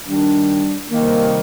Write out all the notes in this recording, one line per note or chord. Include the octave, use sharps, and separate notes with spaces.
D#3 G3 D4
C3 D#3 G3 A#3